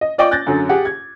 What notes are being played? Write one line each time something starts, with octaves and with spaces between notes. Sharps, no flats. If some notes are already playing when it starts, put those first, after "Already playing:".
D#5
F4 D5 D#5 G5 C#6 D6
F#6 G6 A6 A#6
F#2 D3 F#3
G4 G#4 F#5
G#6